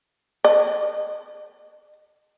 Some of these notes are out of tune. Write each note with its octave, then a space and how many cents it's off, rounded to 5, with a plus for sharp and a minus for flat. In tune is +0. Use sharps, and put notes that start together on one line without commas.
D#5 -25